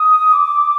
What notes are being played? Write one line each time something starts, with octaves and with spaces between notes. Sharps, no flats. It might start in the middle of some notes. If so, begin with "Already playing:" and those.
Already playing: D#6
D6